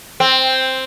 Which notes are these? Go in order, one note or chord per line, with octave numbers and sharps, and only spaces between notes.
C4